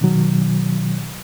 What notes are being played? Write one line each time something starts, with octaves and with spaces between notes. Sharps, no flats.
B2 D#3 F#3